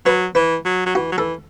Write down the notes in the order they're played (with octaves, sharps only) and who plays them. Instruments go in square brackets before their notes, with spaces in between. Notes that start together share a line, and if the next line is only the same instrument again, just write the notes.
[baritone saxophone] F#3 [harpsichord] B4
[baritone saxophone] E3 [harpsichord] B4
[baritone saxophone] F#3
F#3
[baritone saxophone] E3 [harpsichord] F#4
[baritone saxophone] F#3
[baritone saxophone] E3 [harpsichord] A4